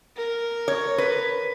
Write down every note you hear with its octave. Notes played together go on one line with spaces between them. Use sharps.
A#4
C#5
B4